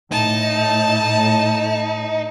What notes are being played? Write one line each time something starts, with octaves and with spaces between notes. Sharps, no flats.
A2 D#4 A5